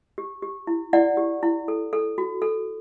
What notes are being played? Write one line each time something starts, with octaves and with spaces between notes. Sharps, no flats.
G4
G4
E4
E4 D5 F#5
G4
E4
A4
A4
F#4
A4